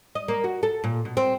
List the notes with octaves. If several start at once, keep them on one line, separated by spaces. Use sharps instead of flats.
D#5
A#3
F#4
A4
A#2
B2
C4